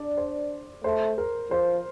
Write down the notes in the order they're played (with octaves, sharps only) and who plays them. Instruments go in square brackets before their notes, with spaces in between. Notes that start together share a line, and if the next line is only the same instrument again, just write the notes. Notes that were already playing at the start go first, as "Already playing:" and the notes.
Already playing: [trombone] D4 [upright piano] D5
[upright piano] C5
[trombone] A3 [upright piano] C5
[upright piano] A#4
[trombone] F3 [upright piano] C5